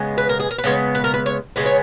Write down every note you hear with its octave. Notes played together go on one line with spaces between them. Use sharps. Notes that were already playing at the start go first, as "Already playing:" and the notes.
Already playing: C#3 G#3 B3
B4
A#4
G#4
A#4
B4
C#3 G#3 B3 C#5
B4
A#4
B4
C#5
C#3 G#3 B3 B4
C#5